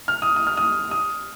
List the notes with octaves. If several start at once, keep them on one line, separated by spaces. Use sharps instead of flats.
F6
D#6
D#6
F6
D#6
D#6